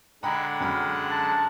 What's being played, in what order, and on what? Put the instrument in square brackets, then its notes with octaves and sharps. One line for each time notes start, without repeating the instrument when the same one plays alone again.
[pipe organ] D3 G#3 F#5 [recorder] G5 [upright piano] A#5 B5
[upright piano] F#2 B5 F6
[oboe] A5 [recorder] F#6